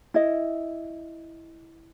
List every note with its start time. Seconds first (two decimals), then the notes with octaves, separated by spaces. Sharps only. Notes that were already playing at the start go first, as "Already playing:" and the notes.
0.14 E4 D#5